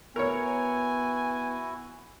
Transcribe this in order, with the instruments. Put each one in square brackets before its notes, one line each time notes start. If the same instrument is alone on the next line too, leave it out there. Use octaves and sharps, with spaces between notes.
[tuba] B3 [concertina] E4 F#4 [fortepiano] A#4 C#5 [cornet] G#5